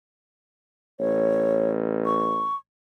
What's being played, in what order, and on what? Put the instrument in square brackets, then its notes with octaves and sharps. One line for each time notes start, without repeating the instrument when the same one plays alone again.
[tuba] A1 [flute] C#5
[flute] C#6